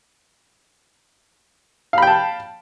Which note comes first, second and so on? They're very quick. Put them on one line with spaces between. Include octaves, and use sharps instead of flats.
F5 B5 G5 A5